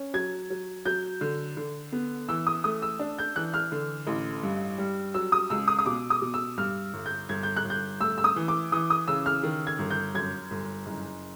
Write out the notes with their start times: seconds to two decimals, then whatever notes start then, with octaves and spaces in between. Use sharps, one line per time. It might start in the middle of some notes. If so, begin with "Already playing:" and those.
Already playing: C#4
0.14 F#3 G#6
0.50 F#3
0.85 F#3 G6
1.21 D3
1.57 D3
1.92 B3
2.29 E3 E6
2.47 D#6
2.64 A3 D#6
2.82 E6
2.99 D4
3.18 G6
3.36 E3 F#6
3.54 F6
3.72 D3
4.07 A1
4.43 G2
4.78 G3
5.14 F#3 E6
5.32 D#6
5.50 C#2 E6
5.68 D#6
5.79 D#6
5.86 B2 D6
6.10 D#6
6.22 B2
6.34 E6
6.58 G2 F6
6.93 G1
7.06 G6
7.29 G1 G#6
7.43 G6
7.56 F#6
7.64 G1
7.70 G6
8.00 A3 E6
8.18 E6
8.24 D#6
8.36 E3
8.48 D6
8.72 E3 D#6
8.90 D#6
9.08 C#3 E6
9.26 F6
9.43 D#3
9.67 G#6
9.78 G1
9.90 G6
10.14 F#2 G#6
10.51 G1
10.86 F#1